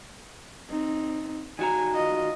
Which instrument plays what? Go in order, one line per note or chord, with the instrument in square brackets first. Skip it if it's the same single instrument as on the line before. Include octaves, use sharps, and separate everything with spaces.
[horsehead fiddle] C4 D#4
[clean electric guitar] D#3 F#4 A#5 [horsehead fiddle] G#5
[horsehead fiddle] F4 D#5